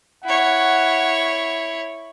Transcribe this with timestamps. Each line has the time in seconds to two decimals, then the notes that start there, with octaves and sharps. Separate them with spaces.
0.24 E4 C#5 F#5